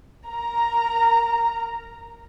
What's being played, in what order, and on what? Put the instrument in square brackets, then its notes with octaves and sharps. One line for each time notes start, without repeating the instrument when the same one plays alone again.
[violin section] A#4 A#5